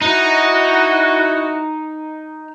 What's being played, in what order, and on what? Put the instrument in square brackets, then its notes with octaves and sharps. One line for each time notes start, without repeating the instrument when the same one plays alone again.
[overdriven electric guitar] D#4 [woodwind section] E4 F#4